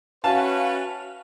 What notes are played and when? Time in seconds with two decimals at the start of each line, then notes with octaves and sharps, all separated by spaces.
0.24 C#4 F#4 B4 E5 F5 A5